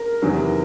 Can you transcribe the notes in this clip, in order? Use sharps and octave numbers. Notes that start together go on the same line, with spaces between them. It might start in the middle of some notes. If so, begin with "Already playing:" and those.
Already playing: A#4
E2 C3 D#3 F#3 B3